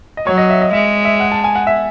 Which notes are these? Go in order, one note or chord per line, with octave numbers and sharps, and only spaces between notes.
D#5
F#3 C#5
D#5
E5
D#5
G#3 E5
E5
F#5
A5
G#5
F#5
E5